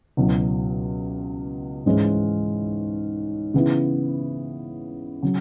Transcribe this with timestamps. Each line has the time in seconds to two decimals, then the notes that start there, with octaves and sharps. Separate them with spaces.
0.17 C#2 B2 F#3 C#4 E4
1.86 G#2 E3 G#3 C#4 E4
3.54 C#3 E3 B3 E4
5.22 C#3 F#3